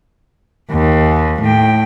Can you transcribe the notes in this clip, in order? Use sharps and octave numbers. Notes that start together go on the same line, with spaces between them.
D#2
A2 G5